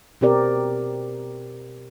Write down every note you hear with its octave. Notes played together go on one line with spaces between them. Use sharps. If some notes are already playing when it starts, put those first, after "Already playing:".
B2 C4 G4 A#4 D5